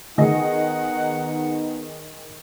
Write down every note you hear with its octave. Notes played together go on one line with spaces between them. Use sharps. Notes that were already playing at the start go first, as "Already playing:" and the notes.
D#3 B3 D#4 G#4 D#5 F#5